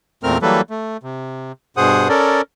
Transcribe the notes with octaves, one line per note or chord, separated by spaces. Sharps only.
E2 A#2 A3 C4 A#4 F6
E3 F#3 G3 A#3 A4 B4
A3
C3
G2 B2 G#4 C5 F#5 D#6
C#4 A4 A#4 D5